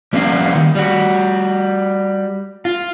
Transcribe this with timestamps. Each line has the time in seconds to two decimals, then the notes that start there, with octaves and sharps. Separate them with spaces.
0.13 F3 G3 A#3 B3 C#4 F5
0.55 D#3
0.75 G3 F#4
2.65 F4